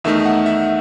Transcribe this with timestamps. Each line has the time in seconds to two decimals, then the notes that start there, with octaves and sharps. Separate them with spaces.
0.04 E2 D#3 A3 D#4 E5
0.26 F#5
0.46 E5